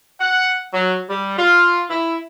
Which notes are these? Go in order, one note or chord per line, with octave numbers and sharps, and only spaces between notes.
F#5
F#3
G3
F4
E4